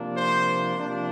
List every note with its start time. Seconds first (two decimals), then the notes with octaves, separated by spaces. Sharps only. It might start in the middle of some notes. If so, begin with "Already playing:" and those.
Already playing: C3 F3 A#3 D4
0.17 C5
0.76 C3 F3 A#3 D4